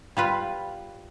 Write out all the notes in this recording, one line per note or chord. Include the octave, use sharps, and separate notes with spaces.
G3 F4 B4